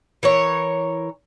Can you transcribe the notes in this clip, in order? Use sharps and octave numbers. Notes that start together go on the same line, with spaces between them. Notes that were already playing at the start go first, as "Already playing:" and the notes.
E3 A#4 C#5